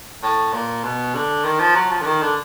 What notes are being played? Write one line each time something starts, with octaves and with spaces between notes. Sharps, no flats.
A2
A#2
B2
D3
D#3
F3
F#3
F3
D3
D#3
D3